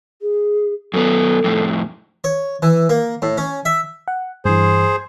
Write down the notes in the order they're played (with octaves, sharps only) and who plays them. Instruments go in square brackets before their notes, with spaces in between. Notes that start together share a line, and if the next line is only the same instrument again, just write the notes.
[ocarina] G#4
[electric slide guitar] F#2 B3 [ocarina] A4
[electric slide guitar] F2 A2
[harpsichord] C#5
E3
A#3
A2
C#4
E5
[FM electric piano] F#5
[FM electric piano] G2 E3 [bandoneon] G#4 C5